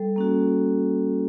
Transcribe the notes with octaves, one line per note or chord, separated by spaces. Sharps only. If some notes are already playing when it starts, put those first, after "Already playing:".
Already playing: G3 A4
A#3 C#4 F#4